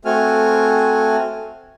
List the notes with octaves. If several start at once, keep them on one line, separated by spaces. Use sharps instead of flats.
A3 C4 F#4 G#5 F6